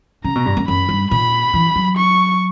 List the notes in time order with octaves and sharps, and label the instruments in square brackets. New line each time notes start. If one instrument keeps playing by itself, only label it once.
[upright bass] C#3 [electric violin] A#5
[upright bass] B2
G2
F#2
[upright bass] F#2 [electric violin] B5
[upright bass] G2
[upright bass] A#2 [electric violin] B5
[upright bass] E3
F#3
[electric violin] C#6